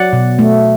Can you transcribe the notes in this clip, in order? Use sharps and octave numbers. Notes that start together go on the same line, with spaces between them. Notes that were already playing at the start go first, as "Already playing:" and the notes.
Already playing: F#3 D5 F#5
B2
A3